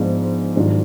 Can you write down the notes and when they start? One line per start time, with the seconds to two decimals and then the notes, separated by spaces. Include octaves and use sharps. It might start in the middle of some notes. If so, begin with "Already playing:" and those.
Already playing: G#2 F3 G#3 B3 D4
0.56 G#2 D#3 F#3 D4 F4